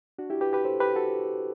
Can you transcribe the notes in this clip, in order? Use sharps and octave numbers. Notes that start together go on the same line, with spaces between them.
D4 F#4
E4 G4
G4 B4
G4 B4
A4 C5
G4 B4
F#4 A4